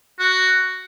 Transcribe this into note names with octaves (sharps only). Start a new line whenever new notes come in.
F#4